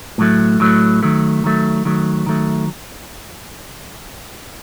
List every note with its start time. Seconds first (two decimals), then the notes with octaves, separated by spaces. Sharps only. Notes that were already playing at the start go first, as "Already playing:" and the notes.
0.18 A2 F#3 A3
0.60 A2 F#3 A3
1.03 D#3 F#3 A3
1.44 D#3 F#3 A3
1.85 D#3 F#3 A3
2.26 D#3 F#3 A3